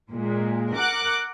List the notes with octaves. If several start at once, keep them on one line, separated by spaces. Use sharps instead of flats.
A#2 G#3
A#4 F#5 D6 F#6